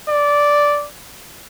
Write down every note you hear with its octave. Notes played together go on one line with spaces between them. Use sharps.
D5